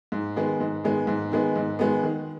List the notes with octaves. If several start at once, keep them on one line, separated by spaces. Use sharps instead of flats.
G#2
D#3 G#3 B3
G#2
D#3 G#3 B3
G#2
D#3 G#3 B3
G#2
D#3 G#3 B3
D#3